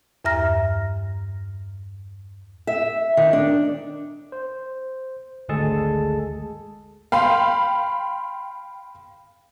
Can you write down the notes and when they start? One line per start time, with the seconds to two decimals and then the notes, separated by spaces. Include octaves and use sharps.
0.25 E2 G2 E5 A#5 F6 A#6
2.67 E5
3.17 D#3
3.33 D4
4.32 C5
5.49 G#1 D2 G#3 G#4 A4 A5
7.12 F5 G5 B5 C6